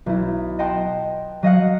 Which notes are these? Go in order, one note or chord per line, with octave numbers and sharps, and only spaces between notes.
B1 E4
D#5 F#5 G5 A5 C6
F#3 D#5 F5 F#5